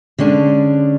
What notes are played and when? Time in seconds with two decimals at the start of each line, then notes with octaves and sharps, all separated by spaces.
0.18 D3 G#3 C#4 D4